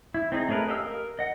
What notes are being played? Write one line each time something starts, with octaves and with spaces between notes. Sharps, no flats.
E4
C4 D#4 G#4
A3 C#4 G#4 A#4 B4
G4 D#5 F5 E6
A#4
D#5 F#5